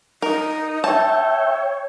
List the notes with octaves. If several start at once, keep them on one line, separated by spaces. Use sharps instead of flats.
D#4 A#4
C#5 E5 G5 A5